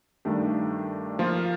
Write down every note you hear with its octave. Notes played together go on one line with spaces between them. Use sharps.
G2 D#3 A3 D4 G4
F3 A#3 F4